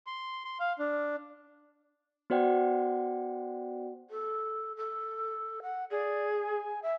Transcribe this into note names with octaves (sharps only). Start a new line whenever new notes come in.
C6
C6
F5
D4
B3 F#4 C5 D5 F#5 G5
A4
A4
F#5
G#4 D5
G#5
E5